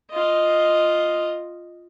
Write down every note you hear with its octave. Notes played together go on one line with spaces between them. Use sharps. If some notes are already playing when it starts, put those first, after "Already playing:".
F4 D#5